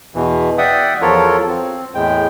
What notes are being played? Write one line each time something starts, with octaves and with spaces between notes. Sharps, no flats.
E2 B2 E3
D5 E5 F#5 G5 D#6
E2 F3 F4 A4 A#4 C#5
C4
E2 A2 G#3 G5